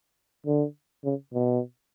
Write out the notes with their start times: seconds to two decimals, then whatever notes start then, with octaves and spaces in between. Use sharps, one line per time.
0.46 D3
1.05 C#3
1.33 B2